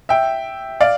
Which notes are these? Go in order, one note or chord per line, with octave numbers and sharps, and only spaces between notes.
E5 G5
D5 F5